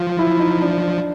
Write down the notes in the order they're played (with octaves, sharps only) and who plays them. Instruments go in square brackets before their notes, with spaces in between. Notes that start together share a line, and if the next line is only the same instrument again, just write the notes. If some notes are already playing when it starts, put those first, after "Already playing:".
Already playing: [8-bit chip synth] F3 [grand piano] F4
[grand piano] E4
D#4
D4